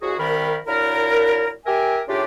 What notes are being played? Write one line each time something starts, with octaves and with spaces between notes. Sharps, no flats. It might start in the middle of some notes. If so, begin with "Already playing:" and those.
C2 F#4 G#4
C2 D#3 A#4 B5
A#2 F#3 D4 E4 A#4
G4 A#4 E5 G#5
A2 C#3 D4 F4 G4